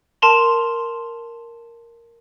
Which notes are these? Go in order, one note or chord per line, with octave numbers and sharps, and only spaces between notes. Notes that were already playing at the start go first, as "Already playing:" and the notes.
A#4 A5 C6 F7